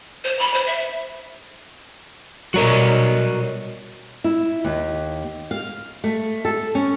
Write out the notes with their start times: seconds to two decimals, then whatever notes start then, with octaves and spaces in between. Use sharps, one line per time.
0.24 C5
0.39 B5
0.54 C5
0.67 E5
2.54 B2 G3 F#4 A#4 C#5 D#5
4.24 E4
4.64 D#2
5.51 F5
6.04 A3
6.45 A4
6.75 C#4